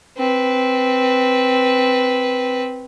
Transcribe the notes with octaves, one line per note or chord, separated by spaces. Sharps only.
C4 B4